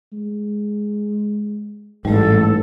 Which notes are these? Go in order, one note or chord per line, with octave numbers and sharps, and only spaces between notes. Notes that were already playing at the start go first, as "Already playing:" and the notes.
G#3
A1 G#2 G3 A3 A4